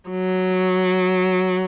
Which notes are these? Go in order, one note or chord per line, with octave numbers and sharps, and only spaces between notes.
F#3